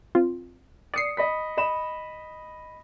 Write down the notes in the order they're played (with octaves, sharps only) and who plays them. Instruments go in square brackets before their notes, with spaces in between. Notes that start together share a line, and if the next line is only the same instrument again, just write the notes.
[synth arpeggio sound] C4 F4
[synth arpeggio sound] D5 C7 [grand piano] D#6 C#7
[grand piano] D#5 B5 B6
D#5 B5 E7